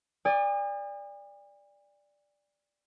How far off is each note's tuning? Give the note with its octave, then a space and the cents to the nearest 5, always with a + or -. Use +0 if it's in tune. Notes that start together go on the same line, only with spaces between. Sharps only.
D5 +0 G#5 -45 D#6 -35